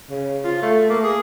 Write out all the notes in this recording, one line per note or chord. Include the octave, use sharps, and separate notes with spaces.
C#3
F4
A3
A#3
G#4